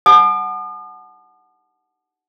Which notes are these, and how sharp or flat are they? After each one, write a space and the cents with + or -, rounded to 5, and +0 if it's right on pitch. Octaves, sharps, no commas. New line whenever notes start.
F#5 +0 A5 -25 D#6 -45